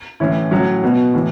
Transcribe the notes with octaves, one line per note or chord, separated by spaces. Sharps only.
A2 E3 C#4 E4
A2 F#3 C#4
B2 B3 F#4
A2 E3